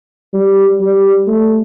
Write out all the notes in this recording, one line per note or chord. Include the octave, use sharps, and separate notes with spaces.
G3
G3
A3